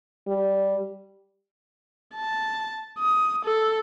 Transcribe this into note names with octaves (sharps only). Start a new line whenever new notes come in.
G3
A5
D#6
A4